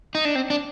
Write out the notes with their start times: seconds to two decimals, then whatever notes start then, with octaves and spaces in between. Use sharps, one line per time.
0.15 D#4
0.25 D4
0.35 C4
0.50 D4